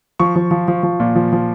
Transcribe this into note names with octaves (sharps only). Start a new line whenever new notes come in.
F3 C#6
F3
F3
F3
F3
A#2
F3
F3